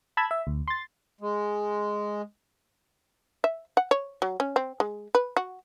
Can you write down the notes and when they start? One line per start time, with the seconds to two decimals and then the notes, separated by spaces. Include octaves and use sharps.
0.17 A5 B5 E6 G#6
0.31 E5
0.47 D2
0.68 C6 A6
1.21 G#3
3.44 E5
3.77 F#5
3.91 C#5
4.22 F#3
4.40 C#4
4.56 C4
4.80 G#3
5.15 B4
5.37 F#4